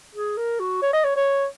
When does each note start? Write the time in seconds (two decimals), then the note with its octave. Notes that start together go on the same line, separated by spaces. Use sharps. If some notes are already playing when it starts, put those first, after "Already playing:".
0.15 G#4
0.37 A#4
0.60 F#4
0.82 C#5
0.93 D#5
1.04 C#5
1.16 C#5